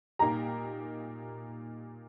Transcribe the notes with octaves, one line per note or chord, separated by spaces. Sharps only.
A#2 A#3 D#4 G4 A#5